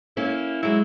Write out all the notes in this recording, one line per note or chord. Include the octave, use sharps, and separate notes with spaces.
A#3 C#4 E4
F#3 G#3 E4